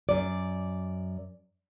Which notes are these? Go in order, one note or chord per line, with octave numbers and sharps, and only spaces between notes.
F#2 D5